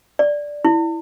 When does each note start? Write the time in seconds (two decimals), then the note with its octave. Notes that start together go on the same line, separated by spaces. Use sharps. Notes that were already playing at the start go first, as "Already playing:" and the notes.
0.19 D5
0.65 E4